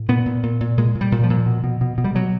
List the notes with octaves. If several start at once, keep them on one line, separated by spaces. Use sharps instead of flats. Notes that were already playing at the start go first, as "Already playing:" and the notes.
Already playing: A2
A#2 B3
A#2
A#2
A#2
A#2 G#3
A#2
G3
A#2
F3
A#2
B2
B2
B2
B2
G3
B2 F#3